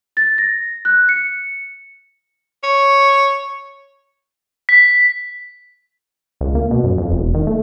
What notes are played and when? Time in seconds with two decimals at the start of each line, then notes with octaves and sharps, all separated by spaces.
0.17 A6
0.38 A#6
0.85 F#6
1.09 C#7
2.64 C#5
4.69 B6
6.41 C#2
6.55 A#3
6.71 B2
6.84 F#2
6.98 F2
7.12 E1
7.34 D#3
7.47 A3